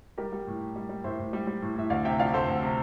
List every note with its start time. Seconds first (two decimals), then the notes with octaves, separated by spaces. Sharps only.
0.18 G3 G4 A#4
0.33 G3
0.47 A2
0.61 A2
0.76 G3
0.89 G3
1.04 A2 C5 E5
1.19 A2
1.33 G3
1.47 G3
1.62 A2
1.76 A2 E5
1.90 D2 D5 F5
2.05 C3 E5 G5
2.19 F3 D5 F5
2.33 D2 A4 C5
2.48 D2
2.63 C3